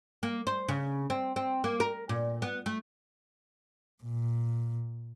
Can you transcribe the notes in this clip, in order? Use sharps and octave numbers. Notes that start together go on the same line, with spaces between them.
A#3
C5
C#3
C4
C4
A#3
A#4
A#2
B3
A3
A#2